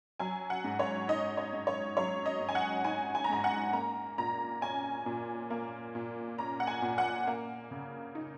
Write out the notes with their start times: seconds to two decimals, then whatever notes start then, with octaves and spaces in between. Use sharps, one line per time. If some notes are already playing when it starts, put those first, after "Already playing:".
0.20 F#3 G#5
0.50 F#5
0.64 G#2
0.79 C#5
1.08 D#4 D#5
1.37 C#5
1.53 G#2
1.67 C#5
1.97 F#3 C#5
2.26 D#5
2.40 G#2
2.49 G#5
2.55 F#5
2.85 D#4 G#5
3.15 G#5
3.24 A#5
3.30 G#2 G#5
3.44 F#5
3.73 A#3 A#5
4.18 A#2 A#5
4.61 C#4 G#5
5.06 A#2
5.50 A#3
5.95 A#2
6.38 C#4 A#5
6.60 F#5
6.67 G#5
6.82 A#2
6.98 F#5
7.27 A#3
7.71 C#3
8.15 D#4